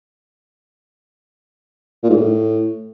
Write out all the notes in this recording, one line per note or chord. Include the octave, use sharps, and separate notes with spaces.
A#2
G#2
A2